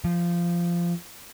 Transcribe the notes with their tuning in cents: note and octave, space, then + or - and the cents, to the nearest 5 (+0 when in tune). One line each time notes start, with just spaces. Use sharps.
F3 -15